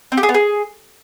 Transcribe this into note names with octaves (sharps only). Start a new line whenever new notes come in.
C4
G4
G#4
B3
G#4